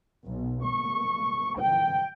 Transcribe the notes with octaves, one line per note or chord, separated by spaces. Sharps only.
B1
C#6
G5